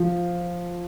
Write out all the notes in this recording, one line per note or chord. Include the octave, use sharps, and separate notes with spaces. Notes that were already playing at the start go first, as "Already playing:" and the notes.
Already playing: F3